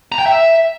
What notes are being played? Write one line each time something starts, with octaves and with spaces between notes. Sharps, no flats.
A#5
G5
E5